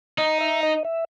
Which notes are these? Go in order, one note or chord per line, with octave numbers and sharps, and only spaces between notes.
D#4 D#5
E5
D#5
E5